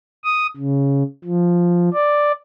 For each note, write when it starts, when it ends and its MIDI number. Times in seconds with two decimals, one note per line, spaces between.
0.24 0.46 87
0.57 1.03 49
1.24 1.89 53
1.94 2.32 74